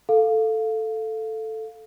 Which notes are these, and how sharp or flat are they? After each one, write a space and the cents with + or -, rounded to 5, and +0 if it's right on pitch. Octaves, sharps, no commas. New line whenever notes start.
A4 +0 F5 +0